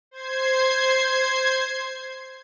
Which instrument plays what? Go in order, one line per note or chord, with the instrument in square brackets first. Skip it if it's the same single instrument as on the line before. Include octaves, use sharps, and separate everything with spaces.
[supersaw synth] C5 G#6 C7